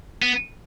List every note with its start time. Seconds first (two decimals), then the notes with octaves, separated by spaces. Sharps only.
0.22 B3